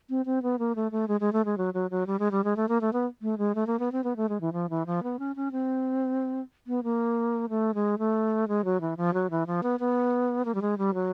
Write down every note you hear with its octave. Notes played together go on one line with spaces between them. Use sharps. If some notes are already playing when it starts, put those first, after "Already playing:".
C4
C4
B3
A#3
A3
A3
G#3
G#3
A3
G#3
F#3
F#3
F#3
G3
G#3
G3
G#3
A3
A#3
A3
B3
A3
G#3
A3
A#3
B3
C4
B3
A3
G#3
E3
F3
E3
F3
B3
C#4
C#4
C4
B3
A#3
A3
G#3
A3
G#3
F#3
E3
F3
F#3
E3
F3
B3
B3
A#3
G3
G#3
G3
F#3